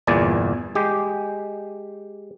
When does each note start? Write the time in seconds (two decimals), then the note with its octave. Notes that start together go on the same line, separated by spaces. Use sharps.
0.07 G1 E2 A#2 D5 G#5
0.75 G#3 G4